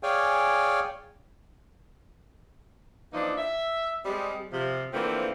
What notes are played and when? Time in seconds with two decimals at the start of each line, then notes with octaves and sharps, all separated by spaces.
0.03 G#4 C#5 D5 F5 G5 G#5
3.13 E3 F3 A#3 D4 D#4
3.38 E5
4.05 G3 G#3 C4
4.52 C3 F3
4.93 D3 E3 F3 A3 A#3 C4